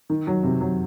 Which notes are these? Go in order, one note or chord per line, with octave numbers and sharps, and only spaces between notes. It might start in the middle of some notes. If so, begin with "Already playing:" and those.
D#3
F#3
C3
F#3